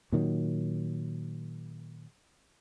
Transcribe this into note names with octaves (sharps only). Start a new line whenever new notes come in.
A#2 D#3 F#3